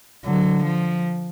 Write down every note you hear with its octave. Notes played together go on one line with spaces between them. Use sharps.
D3 F#3
F3